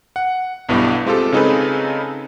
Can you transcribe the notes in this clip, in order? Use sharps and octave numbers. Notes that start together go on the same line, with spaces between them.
F#5
B1 G2 B3 E4 G4
G#3 C4 F4 G4 A4
C#3 C4 D#4 G#4 A4 B4